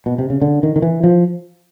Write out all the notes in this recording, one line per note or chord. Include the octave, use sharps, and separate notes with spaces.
B2
C3
C#3
D3
D#3
D#3
E3
F3